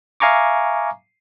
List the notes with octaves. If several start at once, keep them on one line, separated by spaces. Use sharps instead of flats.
E5 F5 G#5 A#5 C#6 D6